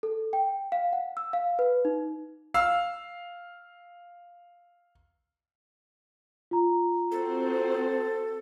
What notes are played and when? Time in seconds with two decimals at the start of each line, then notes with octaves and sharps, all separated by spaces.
0.03 A4
0.33 G5
0.72 F5
0.93 F#5
1.17 E6
1.33 F5
1.59 B4
1.85 D#4
2.54 F5 E6
6.51 F4 A#5
7.11 C4 F#4 A4 C5